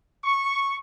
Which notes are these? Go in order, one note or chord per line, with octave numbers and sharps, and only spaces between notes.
C#6